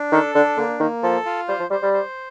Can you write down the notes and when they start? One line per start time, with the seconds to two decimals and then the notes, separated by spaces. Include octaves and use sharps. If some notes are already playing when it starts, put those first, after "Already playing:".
Already playing: D4
0.12 D#3 A4
0.35 D3 D4
0.57 D3 A#3
0.80 D#3 A#3
1.03 F3 A4
1.26 F4
1.48 G3 C5
1.60 F3
1.71 G3 C5
1.83 G3
1.93 C5